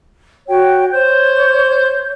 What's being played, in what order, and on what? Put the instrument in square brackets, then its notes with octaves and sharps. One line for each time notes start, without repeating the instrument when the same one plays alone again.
[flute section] F#4 C#5 G5
[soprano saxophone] C5 [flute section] C#5 G6